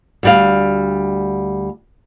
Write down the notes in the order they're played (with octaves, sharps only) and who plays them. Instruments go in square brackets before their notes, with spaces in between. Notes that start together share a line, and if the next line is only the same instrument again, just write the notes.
[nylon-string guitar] D2 G3 F5